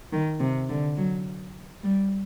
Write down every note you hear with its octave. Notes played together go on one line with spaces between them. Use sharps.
D#3
C3
D3
F#3
G3